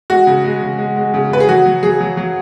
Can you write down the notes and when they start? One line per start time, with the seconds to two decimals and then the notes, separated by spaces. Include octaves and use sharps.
0.10 G#3 F#4
0.27 C#3
0.44 G#3
0.62 C#3
0.78 G#3
0.96 G#3
1.14 C#3
1.31 C#3 B4
1.40 G#4
1.48 F#3 F#4
1.66 F#3
1.83 F#3 G#4
2.01 F#3
2.17 F#3